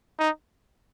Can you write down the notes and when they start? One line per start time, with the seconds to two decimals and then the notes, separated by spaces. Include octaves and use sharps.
0.19 D#4